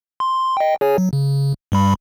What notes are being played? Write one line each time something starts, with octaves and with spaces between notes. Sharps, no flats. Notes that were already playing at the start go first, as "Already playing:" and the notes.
C6
D#5 G5
G#4 C#5 G#5
F#3
C#3
G2 G3 B5